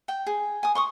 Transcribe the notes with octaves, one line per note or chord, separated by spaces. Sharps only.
G5
G#4
G#5 D#6
C6 C#6 D#6